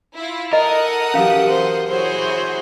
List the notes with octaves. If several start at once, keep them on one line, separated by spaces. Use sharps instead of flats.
E4 F4
A4 A#4 D#5 F#5 D#6
E3 F#3 C#4 G4 F5
C5
E4 F#4 G#4 C5 C#5